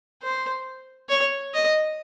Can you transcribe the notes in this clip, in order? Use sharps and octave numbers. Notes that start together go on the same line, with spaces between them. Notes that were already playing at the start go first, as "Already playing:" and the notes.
C5
C#5
D#5